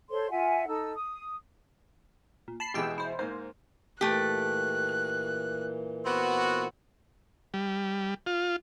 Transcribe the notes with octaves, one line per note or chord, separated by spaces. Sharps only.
A4 C5 C#5 C6
F4 E5 F#5 G#5
D#4 A4 E6
D#6
A#2
A5 B5 C7
B2 E3 G#3 G4 G5 E6
E4 C5
G#2 A#3 C5
A#2 E3 A3 G4 F#6
B3 C4 F#4
G3
F4